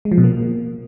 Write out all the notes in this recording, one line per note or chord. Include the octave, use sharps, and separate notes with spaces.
G#3
F3
B2
A#3